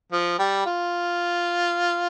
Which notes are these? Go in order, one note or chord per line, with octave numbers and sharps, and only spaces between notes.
F3
G3
F4